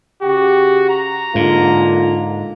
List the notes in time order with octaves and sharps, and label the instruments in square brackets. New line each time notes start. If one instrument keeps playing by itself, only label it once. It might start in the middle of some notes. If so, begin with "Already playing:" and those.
[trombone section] C#3 G4 [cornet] F#4
[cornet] A#5
[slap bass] G#2 [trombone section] D3 A#3 F4